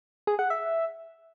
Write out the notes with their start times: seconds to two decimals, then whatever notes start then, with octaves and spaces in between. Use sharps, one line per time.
0.27 G#4
0.39 F#5
0.50 E5